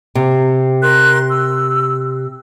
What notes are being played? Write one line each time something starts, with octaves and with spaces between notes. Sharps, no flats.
C3
A#4 C6 F#6
E6